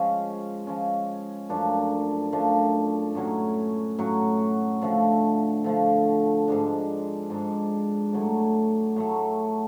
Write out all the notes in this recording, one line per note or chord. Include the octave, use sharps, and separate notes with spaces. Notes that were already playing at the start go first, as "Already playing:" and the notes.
Already playing: F3 G#3 C#4
F3 G#3 C#4
F#2 F3 A3 D4
F#2 F3 A3 D4
A2 F#3 C#4 F#4
A2 F#3 C#4 F#4
D3 F3 A3
D3 F3 A3
G#2 G#3 D4
G#2 G#3 D4
A2 F#3 A3
A2 F#3 A3